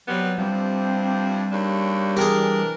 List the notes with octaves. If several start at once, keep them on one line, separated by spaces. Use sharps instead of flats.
C3 F#3 G3 B3
G2 C3 F3 G3 C4
D#2 C#3 D4
E3 D4 G4 G#4 A#4